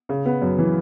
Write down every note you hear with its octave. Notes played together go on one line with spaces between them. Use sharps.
C#3
B3
F#2
E3